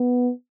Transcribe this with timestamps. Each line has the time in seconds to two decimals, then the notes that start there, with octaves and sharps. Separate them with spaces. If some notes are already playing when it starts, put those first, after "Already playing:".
Already playing: B3